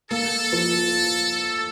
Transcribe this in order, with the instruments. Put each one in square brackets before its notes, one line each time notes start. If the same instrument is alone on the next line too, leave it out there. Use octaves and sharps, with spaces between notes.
[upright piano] A#3 [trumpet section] A4
[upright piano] F3